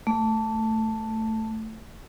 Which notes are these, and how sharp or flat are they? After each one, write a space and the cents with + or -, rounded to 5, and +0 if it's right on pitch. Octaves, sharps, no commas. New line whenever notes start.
A3 +5